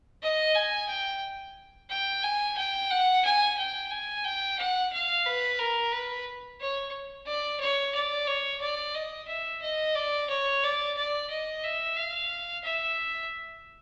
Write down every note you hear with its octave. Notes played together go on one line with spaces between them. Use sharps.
D#5
G#5
G5
G5
G#5
G5
F#5
G#5
G5
G#5
G5
F#5
F5
B4
A#4
B4
C#5
D5
C#5
D5
C#5
D5
D#5
E5
D#5
D5
C#5
D5
D5
D#5
E5
F5
E5